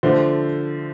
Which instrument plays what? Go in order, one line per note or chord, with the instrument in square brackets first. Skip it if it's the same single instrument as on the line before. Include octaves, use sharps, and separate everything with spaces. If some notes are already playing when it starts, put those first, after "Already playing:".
[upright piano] D3 F3 A3 C5